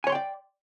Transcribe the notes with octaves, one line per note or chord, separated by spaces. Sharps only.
C#5 D5 G5 G#5 C6